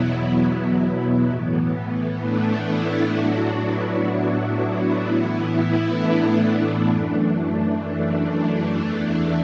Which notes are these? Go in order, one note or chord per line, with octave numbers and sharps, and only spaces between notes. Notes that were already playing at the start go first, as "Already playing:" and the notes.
Already playing: E2 B2 F#3 B3 E4
B3
A2 E3
A3 D4
B3 E4
A2 F#3 D4 F#4
B3 E4
A2 E3
A3 D4
F#2 E3
E2 E3